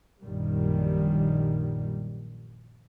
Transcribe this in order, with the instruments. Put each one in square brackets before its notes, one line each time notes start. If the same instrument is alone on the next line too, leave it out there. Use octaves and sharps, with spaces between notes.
[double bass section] A#1 F#2 D#3 G3